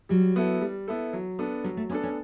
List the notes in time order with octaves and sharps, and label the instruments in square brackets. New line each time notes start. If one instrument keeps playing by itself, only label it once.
[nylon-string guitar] F#3 [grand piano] G3
[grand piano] B3 E4 A4
G3
B3 E4 A4
F#3
B3 D4 A4
[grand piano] F#3 [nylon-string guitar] G3
[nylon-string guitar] A3
[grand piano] B3 D4 A4 [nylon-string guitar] C#4
[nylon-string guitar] C#4